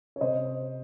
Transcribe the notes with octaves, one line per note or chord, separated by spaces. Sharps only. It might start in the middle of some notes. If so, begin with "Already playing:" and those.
C#5
C3 C5 D#5